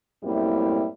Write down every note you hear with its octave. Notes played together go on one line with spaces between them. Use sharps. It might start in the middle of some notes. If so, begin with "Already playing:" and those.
F#2 A2 G3 A#3 C4 E4